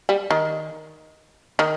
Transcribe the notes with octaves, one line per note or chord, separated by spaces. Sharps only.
G3
D#3
D#3